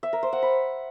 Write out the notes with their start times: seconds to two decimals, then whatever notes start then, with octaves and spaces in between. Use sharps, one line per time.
0.03 E5
0.13 A#4
0.23 C5
0.33 F#5
0.42 B5